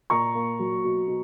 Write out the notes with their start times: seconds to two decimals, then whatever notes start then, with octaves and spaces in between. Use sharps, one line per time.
0.10 A#2 A#5 C#6
0.35 A#3
0.59 F#3
0.84 B2
1.08 B2